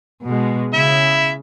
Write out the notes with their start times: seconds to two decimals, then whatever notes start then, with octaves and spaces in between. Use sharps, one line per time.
0.24 B2 G#3
0.74 C#3 E4 E5